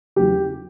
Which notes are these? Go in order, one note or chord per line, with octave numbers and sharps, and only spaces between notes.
E2 C#3 F#3 G4